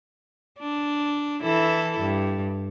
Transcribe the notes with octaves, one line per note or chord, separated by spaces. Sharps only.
D4
E3 E4 A4
G2